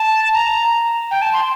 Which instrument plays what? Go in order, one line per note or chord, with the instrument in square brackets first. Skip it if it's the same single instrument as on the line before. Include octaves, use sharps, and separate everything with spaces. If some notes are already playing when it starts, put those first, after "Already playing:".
Already playing: [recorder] A5
A#5
G5
A5
C6